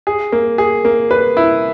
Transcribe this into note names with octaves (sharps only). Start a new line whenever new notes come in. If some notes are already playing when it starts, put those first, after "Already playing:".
G#4
A#3
G#4
A#3
B4
E4